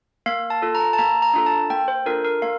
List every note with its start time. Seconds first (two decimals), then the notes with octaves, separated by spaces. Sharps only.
0.26 A#3 F5
0.50 A5
0.62 F4 A4
0.75 A#5
0.93 A5
0.98 A#3 A#5
1.22 A#5
1.34 D4 F4 A4
1.46 A5
1.70 A#3 G5
1.88 C5
2.06 D4 F4 A4 A#4
2.25 A#4
2.42 A#3 F5